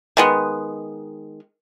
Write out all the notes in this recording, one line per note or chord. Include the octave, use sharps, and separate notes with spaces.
D#3 G#3 B3